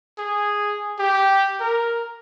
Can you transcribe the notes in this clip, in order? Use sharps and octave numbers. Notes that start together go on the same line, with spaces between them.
G#4
G4
A#4